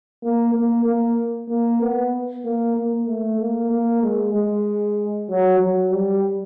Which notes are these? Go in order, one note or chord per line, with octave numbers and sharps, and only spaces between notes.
A#3
A#3
A#3
A#3
B3
A#3
A#3
A3
A#3
A#3
G#3
G#3
F#3
F#3
G3